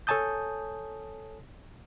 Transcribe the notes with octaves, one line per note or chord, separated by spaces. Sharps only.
A4 C#5 G#5 A5 D#6 G6